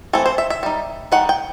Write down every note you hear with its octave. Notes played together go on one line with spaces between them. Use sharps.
E3 A3 C4 A4
C5
E5
E5
G3 D#4
D#3 G3 D#4 F#5
G5